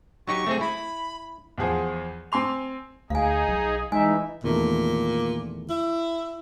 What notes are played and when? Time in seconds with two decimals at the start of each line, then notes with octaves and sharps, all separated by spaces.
0.28 F#3 D#4 G4 C#6
0.46 A3 C4 G#4
0.61 E4 B5
1.58 E2 F3 G#4 C5 F#5
2.32 C4 G#5 C6 F7
3.10 D2 D#4 G#4 F5 G#5
3.48 B1
3.92 E3 G#3 D#4 E5 G#5
4.44 E2 A#2 D#3 A3
5.70 E4